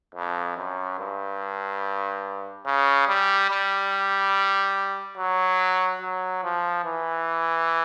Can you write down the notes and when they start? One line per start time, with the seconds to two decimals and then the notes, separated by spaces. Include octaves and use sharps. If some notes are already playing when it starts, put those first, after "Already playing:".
0.15 F2
0.57 F#2
0.98 G2
2.66 C#3
3.08 G3
3.50 G3
5.17 F#3
6.01 F#3
6.43 F3
6.84 E3